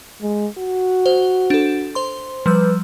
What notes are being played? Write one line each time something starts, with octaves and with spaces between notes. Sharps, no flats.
G#3
F#4
C5
D4 A4
C5 C6
F3 G3 B4 E6